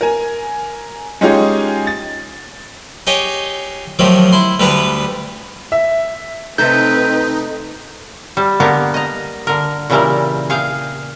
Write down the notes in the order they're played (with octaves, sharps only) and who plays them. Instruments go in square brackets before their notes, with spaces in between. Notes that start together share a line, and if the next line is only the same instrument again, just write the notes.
[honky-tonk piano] A#4 G#5
G#3 C#4 D#4 F4 G4 G#4
A6
[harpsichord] D#4 G4 G#4 C#5 D#5
D#3 F3 F#3 A3 F#4 G4
E4 C6
D2 D3 G3 B3 B4 A#5
[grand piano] E5
[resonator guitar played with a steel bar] C3 A3 A4 [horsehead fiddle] C4 B4 [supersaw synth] D#4 [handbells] G6
[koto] G3
D3 A#3 B3 G4 A#4
D#5 A#5
D3 A#4
A#2 C#3 E3 G3 E4 A#4
G#4 F5 G5